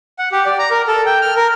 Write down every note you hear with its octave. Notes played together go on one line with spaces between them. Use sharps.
F#5
G4
D5
A#5
A#4
A4
G5
F6
A#4